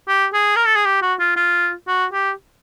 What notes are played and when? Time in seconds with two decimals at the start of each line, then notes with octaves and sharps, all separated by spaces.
0.08 G4
0.34 G#4
0.56 A#4
0.66 A4
0.76 G#4
0.85 G4
1.02 F#4
1.19 F4
1.36 F4
1.87 F#4
2.13 G4